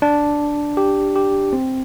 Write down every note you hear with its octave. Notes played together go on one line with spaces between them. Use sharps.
D4
G4
G4
C4